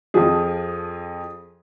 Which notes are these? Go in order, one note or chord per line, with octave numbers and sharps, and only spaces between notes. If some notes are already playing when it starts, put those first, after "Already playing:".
F2 F3 G#4